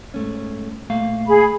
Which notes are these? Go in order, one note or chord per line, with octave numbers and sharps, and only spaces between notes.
G#2 A3 C#4
A#2 A3 F5
G#4 B5